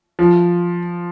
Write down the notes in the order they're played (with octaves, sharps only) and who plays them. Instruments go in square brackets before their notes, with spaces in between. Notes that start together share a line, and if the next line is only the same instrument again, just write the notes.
[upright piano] F3